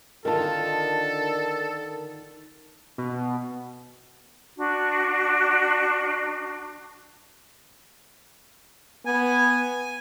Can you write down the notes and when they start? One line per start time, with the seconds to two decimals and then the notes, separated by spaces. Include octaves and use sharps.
0.25 D3 D#3 D#4 F4 A4 A#4 A5
2.98 B2
4.57 D4 F#4
9.06 B3 G#5